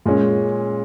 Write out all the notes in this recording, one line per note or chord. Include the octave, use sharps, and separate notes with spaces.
A#2 G#3 C#4